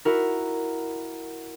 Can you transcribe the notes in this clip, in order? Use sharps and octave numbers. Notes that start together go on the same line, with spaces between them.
E4 F#4 A#4